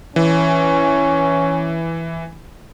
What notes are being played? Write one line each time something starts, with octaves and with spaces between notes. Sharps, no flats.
E3 C#4